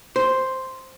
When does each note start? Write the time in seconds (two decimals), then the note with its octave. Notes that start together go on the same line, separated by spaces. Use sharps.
0.16 C5